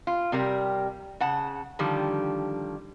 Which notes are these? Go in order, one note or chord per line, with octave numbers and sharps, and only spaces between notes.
F4
C3 G3 A#4
C#3 F#5 A5
D3 D#3 F3 G3